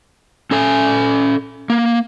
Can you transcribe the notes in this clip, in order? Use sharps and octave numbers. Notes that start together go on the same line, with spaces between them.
C#4 A4 G#5
A#3